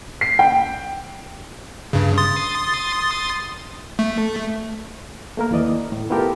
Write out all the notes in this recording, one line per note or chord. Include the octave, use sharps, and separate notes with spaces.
C7
G5
G2 C#3
C6 D#6 A6
A3
A3 A#3 A#4
D#2 E3 D5 D#5
A2
B3 E4 F4 G4 A4 A#4